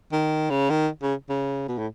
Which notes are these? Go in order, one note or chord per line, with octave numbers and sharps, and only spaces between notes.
D#3
C#3
D#3
C#3
C#3
B2
A2